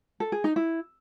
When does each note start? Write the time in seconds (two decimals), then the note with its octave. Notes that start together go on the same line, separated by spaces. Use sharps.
0.20 A4
0.32 G#4
0.44 D#4
0.56 E4